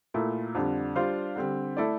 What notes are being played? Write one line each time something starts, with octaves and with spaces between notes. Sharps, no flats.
A#2 A3 E4 A#4
F2 D3 G3 D4
G3 D4 F4 C5 F5
D3 G3 C4
A3 E4 A4 D5